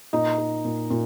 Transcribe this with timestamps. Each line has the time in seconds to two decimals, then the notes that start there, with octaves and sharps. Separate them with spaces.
0.13 A#2 D#4 D#5
0.38 D#4
0.65 A#2
0.90 A#2